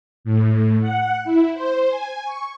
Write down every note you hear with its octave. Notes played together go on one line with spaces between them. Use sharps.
A2
F#5
E4
C5
G#5
C#6